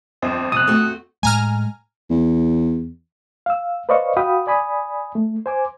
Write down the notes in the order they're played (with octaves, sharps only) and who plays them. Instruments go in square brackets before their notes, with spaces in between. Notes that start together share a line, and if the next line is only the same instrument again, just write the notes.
[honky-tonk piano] G1 F2 C5
[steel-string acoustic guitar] C3 [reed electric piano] D#6 F#6
[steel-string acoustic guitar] A3 C4 F#4
[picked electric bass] A2 G#3 [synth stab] G#5 A#5 F6
[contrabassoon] E2
[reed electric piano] F5 E6
B4 C5 D5 D#5 F5 C#6
F#4 F5 G5 B5 D#6
D5 G#5 B5 D#6
A3
C5 G#5 D6